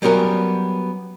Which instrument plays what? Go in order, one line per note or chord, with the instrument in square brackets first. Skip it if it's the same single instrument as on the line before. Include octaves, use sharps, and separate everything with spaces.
[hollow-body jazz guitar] F#3 G3 B3 C#4 A#4